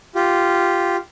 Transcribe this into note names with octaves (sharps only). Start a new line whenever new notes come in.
F4 G4